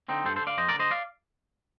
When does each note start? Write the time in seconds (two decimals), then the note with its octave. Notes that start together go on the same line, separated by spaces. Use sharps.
0.08 D3 C4 D#4
0.25 G2 A4 C5
0.36 A4 C5
0.42 D3
0.47 D5 F5
0.57 F2 C5 D#5
0.68 A#4 D5
0.74 D3
0.79 C5 D#5
0.91 D5 F5